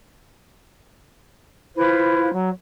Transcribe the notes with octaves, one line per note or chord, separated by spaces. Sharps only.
E4 F4 B4 C5
F#3